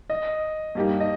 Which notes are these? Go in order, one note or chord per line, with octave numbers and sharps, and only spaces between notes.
D#5
G2 G3 A#3 D#4 G4
D#5